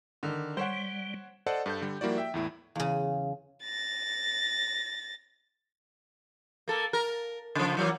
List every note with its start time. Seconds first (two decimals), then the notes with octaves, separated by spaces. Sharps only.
0.23 D3 D#3
0.57 G3 C5 C#5 F#5
1.46 A4 C5 D5 D#5 F#5 A5
1.66 G2 A4 G6
1.82 D3 G3
2.01 F3 G3 A#3 E4 F#4 D5
2.18 E5 G5
2.34 E2 A2 E4
2.76 E2 C#3 F5
3.63 A6 A#6
6.68 A#3 A4
6.93 A#4
7.55 C#3 F3
7.77 E3 F#3 A#3